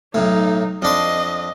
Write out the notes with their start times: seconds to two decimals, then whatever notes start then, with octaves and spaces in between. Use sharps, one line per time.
0.14 B1 A2 D#4
0.82 F2 D4 D#5 C6